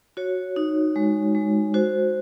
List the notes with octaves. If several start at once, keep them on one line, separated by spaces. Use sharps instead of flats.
F#4 C#5
D#4
G#3
G#3
F#4 C5